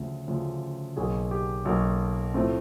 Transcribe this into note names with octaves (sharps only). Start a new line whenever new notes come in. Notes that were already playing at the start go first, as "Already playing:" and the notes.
Already playing: D2 C#3 F3
D2 C#3 F3
B1 B2 F#3 A#3 G#4
G4
B1 B2 F#3 A#3
A2 F3 A3 C4